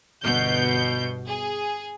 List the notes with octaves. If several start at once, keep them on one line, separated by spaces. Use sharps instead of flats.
G1 B2 G6
G#4